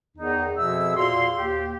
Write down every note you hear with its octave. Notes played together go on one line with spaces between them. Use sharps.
E2 D#3 D#4
F2 B2 F3 G#4 E5 E6
E2 A#2 F#4 F5 C6
D#2 G4